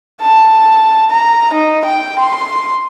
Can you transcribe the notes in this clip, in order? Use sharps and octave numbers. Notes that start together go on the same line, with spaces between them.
A5
A#5
D#4
G5
C6